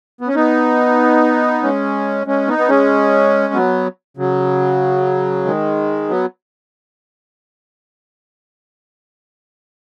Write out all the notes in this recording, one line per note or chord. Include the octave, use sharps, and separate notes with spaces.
B3
C#4
B3 D#4
G#3 C#4
G#3 C#4
B3 D#4
B3
G#3 C#4
F#3 B3
C#3 F#3
D#3 G#3
F#3 B3